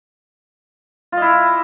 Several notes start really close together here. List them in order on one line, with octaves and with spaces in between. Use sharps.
F4 D#5 E4